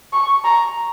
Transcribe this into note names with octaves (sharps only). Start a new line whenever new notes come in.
C#6
A#5